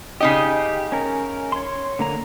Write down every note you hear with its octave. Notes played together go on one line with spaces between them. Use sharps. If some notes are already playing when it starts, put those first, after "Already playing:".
C#3 D#4 G4 D#5
C#4 A#4
C#5 C6
D3 A#3 A#5